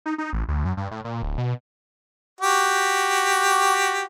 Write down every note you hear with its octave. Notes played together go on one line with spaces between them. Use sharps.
D#4
D#4
A1
D2
F#2
G2
A2
A#2
D1
B2
F#4 G4